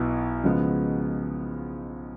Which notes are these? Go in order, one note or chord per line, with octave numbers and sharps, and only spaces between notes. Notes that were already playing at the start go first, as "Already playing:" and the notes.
Already playing: B1 B2 B3 E4
C#3 F3 G#3 B3